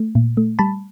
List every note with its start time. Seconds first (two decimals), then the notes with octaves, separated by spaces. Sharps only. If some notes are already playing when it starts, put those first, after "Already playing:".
Already playing: A3
0.15 A#2
0.37 A3
0.59 G3 A5 B5